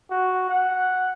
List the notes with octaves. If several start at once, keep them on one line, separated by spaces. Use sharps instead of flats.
F#4
F#5